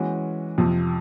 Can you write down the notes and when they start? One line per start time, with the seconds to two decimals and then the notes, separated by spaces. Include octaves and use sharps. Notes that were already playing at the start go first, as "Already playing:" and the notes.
Already playing: E3 G#3 C#4 F#4
0.58 F2 C3 F3